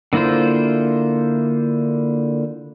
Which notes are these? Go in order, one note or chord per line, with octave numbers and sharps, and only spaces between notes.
D3 A#3 E4 F4 C5